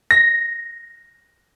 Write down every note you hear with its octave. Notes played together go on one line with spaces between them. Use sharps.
A#6